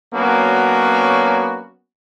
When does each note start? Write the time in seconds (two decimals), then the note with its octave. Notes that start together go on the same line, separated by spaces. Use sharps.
0.14 F#3 A#3 B3 C#4 D4 F#4